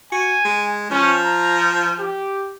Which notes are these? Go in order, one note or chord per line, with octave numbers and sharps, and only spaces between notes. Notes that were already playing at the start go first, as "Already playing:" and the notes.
F#4 G#5
G#3
F3 C#4
A#5
G4